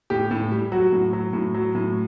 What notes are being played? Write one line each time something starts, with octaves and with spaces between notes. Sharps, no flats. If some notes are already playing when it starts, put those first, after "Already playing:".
A2 G4
A2
G3
F#3 F#4
A2
F#3
A2
F#3
A2